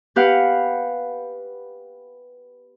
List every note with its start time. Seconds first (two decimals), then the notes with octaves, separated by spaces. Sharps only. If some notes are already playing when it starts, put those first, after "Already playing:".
0.16 B3 G4 B4 F5 F#5